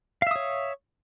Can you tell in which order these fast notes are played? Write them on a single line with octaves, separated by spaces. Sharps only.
F5 E5 D#6 C#5